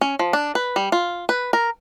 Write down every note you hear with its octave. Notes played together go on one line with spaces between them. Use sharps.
C#4
F3
D4
B4
G3
F4
B4
A#4